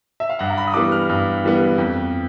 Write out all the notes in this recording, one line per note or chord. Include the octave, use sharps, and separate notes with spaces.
E5
F5
G2 F#5
A#5
B5
D#6
E3 G3 B3 D6
F6
G2
E3 G3 B3
F2